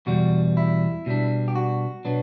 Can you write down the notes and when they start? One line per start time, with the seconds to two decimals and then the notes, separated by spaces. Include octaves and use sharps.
0.07 E2 B2 G3 F#4
0.57 E4
1.06 B2 G3 D4
1.48 G4
1.55 F#4
2.05 B2 F#3 B3 D4